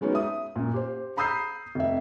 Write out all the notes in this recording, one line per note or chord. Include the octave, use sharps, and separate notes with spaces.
F#3 G#3 B3 C#4 D#4
E5 D#6
F#2 A#2
G4 C5
A#5 B5 D#6 E6 G6 C7
F1 E5